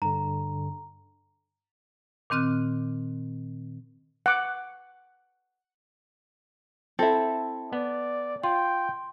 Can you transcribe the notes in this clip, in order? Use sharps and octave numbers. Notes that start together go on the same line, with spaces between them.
G2 D3 A#5
A#2 D#3 C4 F6 F#6
F#5 D6
C4 E4 A4 E5
B3 D5
F4 G5 C6